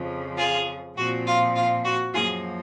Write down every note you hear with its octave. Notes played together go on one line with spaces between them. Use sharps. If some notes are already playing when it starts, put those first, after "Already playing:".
Already playing: F2 C#3 F3
F4 G#4
A#2 F3 C4 F#4
F4
F4
F#4
F#2 F3 A#3 F4 G#4